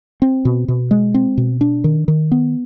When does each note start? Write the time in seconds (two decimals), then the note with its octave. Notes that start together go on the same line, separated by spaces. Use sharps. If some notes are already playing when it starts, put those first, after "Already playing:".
0.22 C4
0.45 B2
0.68 B2
0.91 G#3
1.14 C4
1.38 B2
1.61 D4
1.84 D#3
2.08 D#3
2.32 B3